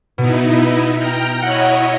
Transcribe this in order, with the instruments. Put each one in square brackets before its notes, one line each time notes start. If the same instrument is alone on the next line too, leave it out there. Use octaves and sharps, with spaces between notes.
[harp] B2 [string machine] B3 D#4 E4
[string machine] G5 A#5 F6
[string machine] E4 C#5 D#5 [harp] F#5